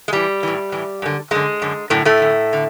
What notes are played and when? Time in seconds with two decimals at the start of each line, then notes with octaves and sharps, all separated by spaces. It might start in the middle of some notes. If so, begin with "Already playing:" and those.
0.08 G#3
0.12 A2 E3 G3
0.43 A2 E3
0.72 A2 E3
1.02 F#2 D3
1.31 F#2 D3 G#3
1.62 F#2 D3
1.90 F#2 A2 D3 A3
2.05 A2 A3
2.20 F#2 D3
2.53 D3